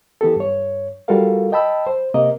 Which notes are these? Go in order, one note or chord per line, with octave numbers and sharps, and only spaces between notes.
E3 B3 G4 A4
G2 C#5
G3 F4 F#4 A4 A#4 F5
D#5 G5 A5 B5 E6
C5
C3 A#3 A#4 D#5